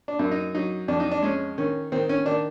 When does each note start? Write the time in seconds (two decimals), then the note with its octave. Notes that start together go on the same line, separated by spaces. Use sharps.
0.08 D4
0.19 F#2
0.31 D#4
0.55 F#3 D#4
0.88 F2 D4
1.00 D#4
1.11 D4
1.22 G#3 C#4
1.58 D#3 C#4
1.92 D#3 C4
2.09 C#4
2.26 D#3 D4